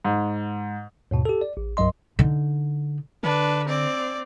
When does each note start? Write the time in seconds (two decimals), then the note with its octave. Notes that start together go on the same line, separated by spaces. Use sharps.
0.05 G#2
1.11 D#2 G#2 B2
1.25 G4 A4
1.41 D5
1.57 A1
1.77 C2 G2 F#3 D#5 C6
2.19 D3 D#4
3.23 D3 D4 B4
3.69 C4 D5